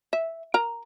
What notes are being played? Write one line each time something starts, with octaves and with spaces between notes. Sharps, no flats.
E5
A#4 A#5